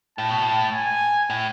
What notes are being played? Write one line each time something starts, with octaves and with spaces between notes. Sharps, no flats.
A2 A5
B2
A2
G#5
A2